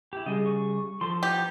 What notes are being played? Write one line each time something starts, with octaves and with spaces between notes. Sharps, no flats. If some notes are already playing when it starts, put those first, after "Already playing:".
E4 G4
C#3 G3 G#4 D#5
C#6
F3 A4 C6
B3 D#4 G4